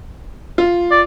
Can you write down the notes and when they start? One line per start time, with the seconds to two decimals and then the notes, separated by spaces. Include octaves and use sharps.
0.58 F4
0.91 D5